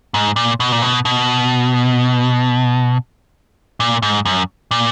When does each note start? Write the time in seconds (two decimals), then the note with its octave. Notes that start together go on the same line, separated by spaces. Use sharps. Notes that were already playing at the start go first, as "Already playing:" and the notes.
0.14 G#2
0.36 A#2
0.60 B2
0.72 A#2
0.82 B2
1.05 B2
3.80 A#2
4.02 G#2
4.25 F#2
4.71 A#2